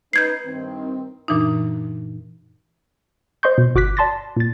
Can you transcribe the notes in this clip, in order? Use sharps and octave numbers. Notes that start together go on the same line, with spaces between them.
C#4 D#4 B4 G6 G#6 C7
G2 D#3 C4
F#2 A#2 E3 D4 D#4
C5 D#5 C6 C#6 G6
B2
G1 F#4 D6 F#6 B6
D5 A5 C6 A6 A#6
A#2 A6